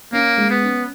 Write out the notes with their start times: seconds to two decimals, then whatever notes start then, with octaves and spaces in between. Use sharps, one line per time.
0.12 A#3 C#4
0.37 G#3
0.50 B3
0.62 C#4